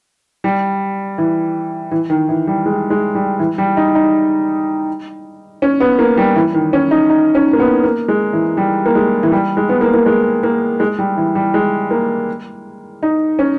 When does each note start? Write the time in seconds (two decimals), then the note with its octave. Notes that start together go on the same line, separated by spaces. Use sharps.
0.44 G3
1.18 E3
1.91 E3
2.10 D#3
2.29 E3
2.47 G3
2.66 G#3
2.90 G#3
3.15 G3
3.39 E3
3.58 G3
3.77 D#4
3.95 D#4
5.62 C#4
5.80 B3
5.99 A#3
6.17 G3
6.36 E3
6.54 D#3
6.73 C#4
6.91 D#4
7.10 D#4
7.35 C#4
7.53 A#3
7.60 B3
7.84 A#3
8.08 G#3
8.33 E3
8.57 G3
8.86 A#3
8.95 G#3
9.23 E3
9.32 G3
9.57 G#3
9.69 B3
9.81 A#3
9.94 A#3
10.06 G#3
10.43 A#3
10.80 G#3
10.98 G3
11.17 E3
11.35 G3
11.54 G#3
11.91 A#3
13.03 D#4
13.39 C#4